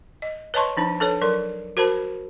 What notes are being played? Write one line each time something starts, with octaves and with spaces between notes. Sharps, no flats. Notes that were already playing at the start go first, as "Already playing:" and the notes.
D#5
B4 C#5 D#5 A5 C6 C#6
F3 D4 D#4
D4 A4 B4 C#5
F#3 A#4 C6
F#4 A#4 C5 A5 B5